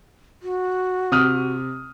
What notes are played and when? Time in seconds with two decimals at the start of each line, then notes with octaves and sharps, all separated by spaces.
0.42 F#4
1.12 C3 D#6 F6